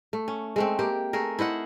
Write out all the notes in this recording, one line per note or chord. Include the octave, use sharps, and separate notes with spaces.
A3
C#4
G#3 A3 C4
A#3 G4
A3 G#4 A#4
E4 C5 D#5 F#5